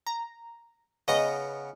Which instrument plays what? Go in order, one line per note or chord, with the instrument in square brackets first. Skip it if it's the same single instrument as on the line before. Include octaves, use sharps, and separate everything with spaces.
[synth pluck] A#5
[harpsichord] C#3 B3 A#5 [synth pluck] D#5